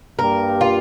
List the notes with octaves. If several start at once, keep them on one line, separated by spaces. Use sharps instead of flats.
G2 G3 A#3 G4 A#4
F4